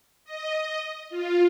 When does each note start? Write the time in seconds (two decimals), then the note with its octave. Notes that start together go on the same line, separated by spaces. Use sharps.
0.24 D#5
1.10 F4